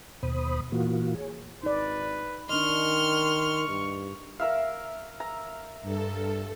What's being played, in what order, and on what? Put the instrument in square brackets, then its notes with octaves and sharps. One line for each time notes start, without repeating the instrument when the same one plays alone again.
[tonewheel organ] D#2 B2 C5 B5 D#6
A#2 E3 A#3 F4 F#4
G#4 C#5
[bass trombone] G#1 [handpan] D#4 D5 [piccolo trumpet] B4
[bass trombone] D#3 [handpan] D4 D#5 [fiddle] C6 F6 [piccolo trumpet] C#6
[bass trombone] G2
[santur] A#4 E5 F5
A#5
[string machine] G2 A4